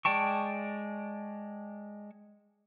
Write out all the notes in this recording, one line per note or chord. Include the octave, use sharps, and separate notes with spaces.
G#3 D5 G5 A5 C#6